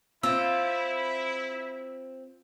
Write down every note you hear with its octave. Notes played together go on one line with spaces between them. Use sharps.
C4 E4 F4 E6